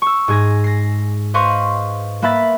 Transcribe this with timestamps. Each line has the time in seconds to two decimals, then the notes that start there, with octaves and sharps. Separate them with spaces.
0.02 C#6 E6
0.28 G#2 G#4 A#6
0.64 A#6 C7
1.34 B4 C5 D#5 F5 C6 C#6
2.22 A#3 B4 E5 B5 A6